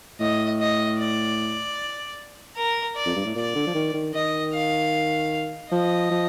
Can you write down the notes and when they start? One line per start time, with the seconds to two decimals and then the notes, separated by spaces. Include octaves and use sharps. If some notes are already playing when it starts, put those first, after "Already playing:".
0.20 A2 D#5
0.60 D#5
0.99 D5
2.56 A#4
2.96 D5
3.06 F2
3.16 G2
3.25 A2
3.35 A#2 D5
3.55 D3
3.67 F3
3.75 D#3
3.94 D#3
4.14 D#3 D#5
4.53 F5
5.72 F3 D#5
6.11 F3